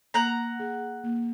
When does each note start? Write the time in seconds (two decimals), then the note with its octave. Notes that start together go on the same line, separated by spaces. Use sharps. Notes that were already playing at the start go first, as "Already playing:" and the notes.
0.14 A#3 F#5 A#5
0.60 G#4
1.04 A#3